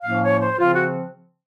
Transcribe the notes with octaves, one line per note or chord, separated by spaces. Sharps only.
A2 F3 A#3 C#4 F5
C#5
C5
C#3 F3 C4 F4
F#4